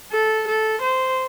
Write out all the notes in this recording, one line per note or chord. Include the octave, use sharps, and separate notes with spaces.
A4
A4
C5